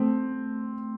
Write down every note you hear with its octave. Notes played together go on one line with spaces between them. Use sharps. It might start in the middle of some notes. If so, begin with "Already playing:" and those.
Already playing: A3 C4